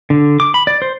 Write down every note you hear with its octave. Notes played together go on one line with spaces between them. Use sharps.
D3
D6
B5
D5
C5